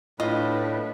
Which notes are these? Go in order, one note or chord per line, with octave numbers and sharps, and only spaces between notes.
A2 D4 F4 B4 D#5